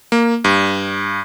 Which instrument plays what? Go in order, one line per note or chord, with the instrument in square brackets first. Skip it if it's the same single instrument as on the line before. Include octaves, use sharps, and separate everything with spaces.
[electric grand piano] A#3
G2